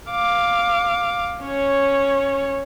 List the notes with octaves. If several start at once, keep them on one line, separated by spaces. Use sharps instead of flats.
F5 D6
C#4 C#5